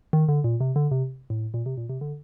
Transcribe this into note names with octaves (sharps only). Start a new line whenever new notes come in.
D#3
D3
A#2
C3
D3
C3
A2
A#2
C3
A#2
C3
D3